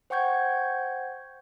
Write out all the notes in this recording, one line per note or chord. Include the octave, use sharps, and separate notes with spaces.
C5 F#5 G5 C#6 G6 G#6